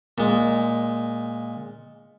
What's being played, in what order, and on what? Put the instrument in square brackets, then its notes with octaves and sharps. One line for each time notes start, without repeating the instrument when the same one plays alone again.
[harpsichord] A#2 G#3